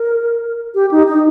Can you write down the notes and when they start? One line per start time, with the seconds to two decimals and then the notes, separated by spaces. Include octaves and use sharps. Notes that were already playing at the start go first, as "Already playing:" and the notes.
Already playing: A#4
0.75 G4
0.91 D#4
1.07 D#4